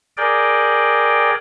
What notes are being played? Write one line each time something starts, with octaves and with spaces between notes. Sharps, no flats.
G#4 A#4 D5 G5